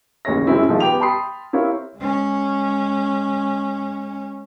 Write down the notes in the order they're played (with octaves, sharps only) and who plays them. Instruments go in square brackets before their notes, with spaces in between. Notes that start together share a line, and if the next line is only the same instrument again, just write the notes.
[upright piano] A1 D#2 C#3 C#5 A#6
F#2 C3 G#3 C4 C#4 E4
D#3 F3 G#3
B3 G4 G5 D6 F7
G5 A5 B5 C6 D#6 C7
C4 E4 G4 A#4 C#5 F5
[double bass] G#3 C#4